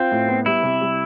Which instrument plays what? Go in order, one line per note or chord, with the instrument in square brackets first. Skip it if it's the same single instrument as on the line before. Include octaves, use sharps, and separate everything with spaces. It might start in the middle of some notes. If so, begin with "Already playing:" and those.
Already playing: [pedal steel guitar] C4 [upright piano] F4
[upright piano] A2
B3
[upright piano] G3 [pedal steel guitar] E4
[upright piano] C3
G3